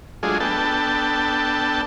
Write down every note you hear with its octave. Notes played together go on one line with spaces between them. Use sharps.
F#3 G#3 A3 D4 F4 G#4
B3 D4 A4 G5 A5